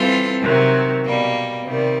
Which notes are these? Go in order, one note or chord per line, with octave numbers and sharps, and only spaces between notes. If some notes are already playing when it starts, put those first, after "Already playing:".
Already playing: E3 G3 C4 F4 A4
C3 D#3 F#3
B2 G3 A#3
C3 D#3 G3